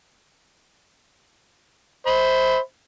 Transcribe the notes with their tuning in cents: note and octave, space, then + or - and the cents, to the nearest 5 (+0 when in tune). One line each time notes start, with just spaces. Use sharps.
C5 +0 E5 -35 B5 +10